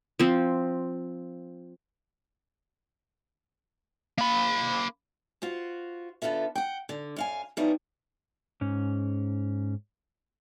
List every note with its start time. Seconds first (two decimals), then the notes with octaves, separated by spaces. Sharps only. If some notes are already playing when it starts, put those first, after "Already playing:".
0.19 F3 C4
4.18 A#3 B5
5.42 F4 F#4 C5
6.22 D3 B3 F4 A4 E5
6.55 F#5 G5
6.89 D3
7.16 F#2 F5 G#5
7.57 E3 F3 G3 B3 D#4 C#5
8.61 G#2 C#4